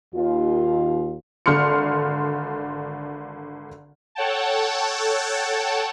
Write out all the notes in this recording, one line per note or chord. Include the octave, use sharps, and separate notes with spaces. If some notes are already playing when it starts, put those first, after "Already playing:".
D#2 F4
G#1 D3 C6 F6 C#7
A4 C#5 F#5 G5 A5